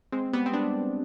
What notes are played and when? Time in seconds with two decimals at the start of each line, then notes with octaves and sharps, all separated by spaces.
0.12 G#3 C4
0.33 G3 B3
0.46 C4
0.53 B3 D4